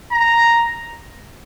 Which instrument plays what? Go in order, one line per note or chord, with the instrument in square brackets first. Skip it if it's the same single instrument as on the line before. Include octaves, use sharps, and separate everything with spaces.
[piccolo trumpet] A#5